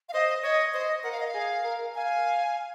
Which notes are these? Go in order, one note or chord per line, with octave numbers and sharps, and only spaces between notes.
F5
C5 D#5
C#5 D#5
C5 D#5
A#4 F#5
F5
D#5
F5
G#4
A#4
F5 G#5